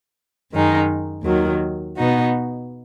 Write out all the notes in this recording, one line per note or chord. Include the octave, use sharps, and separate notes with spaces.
F#2 D#3 G#3 D#4
D#2 D#3 F#3
B2 B3 D#4 F#4